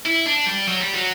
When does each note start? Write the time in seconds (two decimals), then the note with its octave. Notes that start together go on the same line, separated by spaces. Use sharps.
0.06 E4
0.26 D4
0.46 G3
0.68 F#3
0.80 G3
0.94 F#3